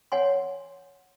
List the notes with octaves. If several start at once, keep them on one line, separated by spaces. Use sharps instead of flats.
C#5 F#5 G#5 C6